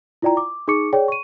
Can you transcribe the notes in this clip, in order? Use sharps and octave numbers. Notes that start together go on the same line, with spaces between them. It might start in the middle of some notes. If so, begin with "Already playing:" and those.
E4 F4 D5 G5 A#5
D6
D#4 G#4 C#6 D6 C#7
G#4 C#5 D5 G5
C#6 D#7